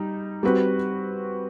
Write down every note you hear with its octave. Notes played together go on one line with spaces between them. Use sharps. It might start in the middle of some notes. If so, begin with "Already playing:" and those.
Already playing: G3 D#4
G3 C4 F#4 B4